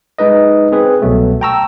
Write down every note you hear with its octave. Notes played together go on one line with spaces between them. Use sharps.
G#3 D#4 B4 D#5
C4 G#4 B4
C2 B2 F#3 A3
G5 A5 A#5 C#6 E6